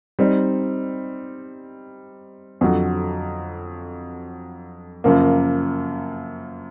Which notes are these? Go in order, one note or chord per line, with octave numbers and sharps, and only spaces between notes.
G3 C4 D#4
F2 D3 F#3
F#2 C#3 F3 A#3